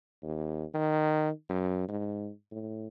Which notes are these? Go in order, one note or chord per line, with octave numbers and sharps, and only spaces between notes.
D#2
D#3
F#2
G#2
A2